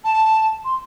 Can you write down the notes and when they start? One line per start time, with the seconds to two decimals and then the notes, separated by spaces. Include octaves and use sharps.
0.04 A5
0.65 C6